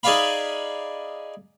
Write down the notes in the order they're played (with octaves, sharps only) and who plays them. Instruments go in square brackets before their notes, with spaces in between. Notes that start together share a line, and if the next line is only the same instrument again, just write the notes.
[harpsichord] D#4 G#4 D5 E5 F5 B5